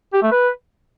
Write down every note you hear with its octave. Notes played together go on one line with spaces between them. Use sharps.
G4
A3
B4